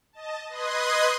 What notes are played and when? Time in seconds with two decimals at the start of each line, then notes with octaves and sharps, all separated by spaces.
0.13 D#5 A5
0.49 B4 D#5 C6 D#6 F#6 G#6